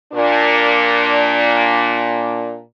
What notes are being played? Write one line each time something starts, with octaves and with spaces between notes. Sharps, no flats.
A#2 D4